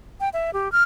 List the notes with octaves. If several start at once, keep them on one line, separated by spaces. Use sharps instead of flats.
G5
E5
G4
F6